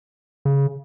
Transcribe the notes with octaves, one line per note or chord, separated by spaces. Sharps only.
C#3